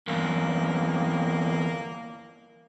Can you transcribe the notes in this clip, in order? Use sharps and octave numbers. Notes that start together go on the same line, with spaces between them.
E2 G2 A#3